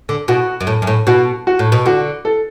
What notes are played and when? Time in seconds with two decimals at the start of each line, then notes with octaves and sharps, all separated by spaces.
0.09 D3
0.28 B2 F#4
0.61 F#2
0.67 A2
0.82 F#2
0.87 A2
1.07 B2 F#4
1.47 F#4
1.59 A2
1.72 B2
1.86 D3 F#4
2.25 A4